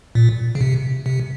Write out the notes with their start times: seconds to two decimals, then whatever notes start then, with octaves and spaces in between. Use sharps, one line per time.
0.15 A#2
0.55 C#3
0.61 C3
1.06 C3